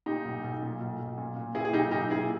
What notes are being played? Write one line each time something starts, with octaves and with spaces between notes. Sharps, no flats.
A#2 D#4 G4
B1
B1
A#2
B1
B1
A#2
A#2
A#2 E4 G#4
G#4
B1 D#4 G4
B1 D#4 G4
A#2 E4 G#4